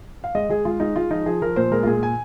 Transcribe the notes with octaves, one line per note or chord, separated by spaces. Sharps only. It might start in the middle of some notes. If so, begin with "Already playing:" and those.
F5
G#3 D#5
G#3 G#4
G#3 F4
G#3 D#4
G#3 F4
F3 D#4
F3 G#4
F3 A#4
A#2 C5
G#3 A#4
F4
A#2 G#4
G#5